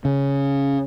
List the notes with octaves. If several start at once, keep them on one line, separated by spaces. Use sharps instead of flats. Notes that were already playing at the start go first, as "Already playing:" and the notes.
C#3